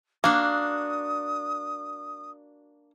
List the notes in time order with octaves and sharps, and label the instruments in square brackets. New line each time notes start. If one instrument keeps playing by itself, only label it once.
[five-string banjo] A#3 [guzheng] D4 F#4 [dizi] D#6